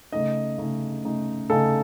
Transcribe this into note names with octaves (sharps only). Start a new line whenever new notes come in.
C#3 A3 D#4 D#5
C#3 A3 D#4
C#3 A3 D#4
C#3 A3 D#4 A4